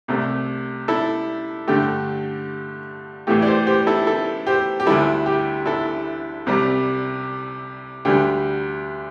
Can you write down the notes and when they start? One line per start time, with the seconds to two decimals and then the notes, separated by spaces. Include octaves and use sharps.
0.08 C2 C3 A3
0.88 E4 A4
1.68 G2 D3 A3 G4
3.27 A2 E3 A3 G4
3.42 D5
3.47 G4 C5
3.67 G4 C5
3.87 E4 A4
4.07 E4 A4
4.47 G4 C5
4.80 G4
4.86 D2 D3 G3 E4 A4
5.26 G4
5.66 E4 A4
6.46 C2 C3 G3
8.05 D2 D3 G3 G4